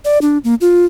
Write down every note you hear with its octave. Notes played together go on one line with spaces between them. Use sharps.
D5
D4
A#3
F4